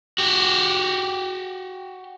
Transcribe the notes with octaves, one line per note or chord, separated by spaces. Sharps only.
F#4 G4